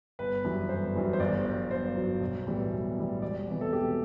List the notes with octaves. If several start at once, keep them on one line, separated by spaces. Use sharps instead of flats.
G1 B4
F#2 E3 G3
G1 C5
F#2 E3 G3
C5
G1 D5
G2 F#3
G1 C5
G2 F#3
B1
A2 E3 G3
B1
A2 E3 G3
E1 D5
E2 C3 E3
A4
E1 G4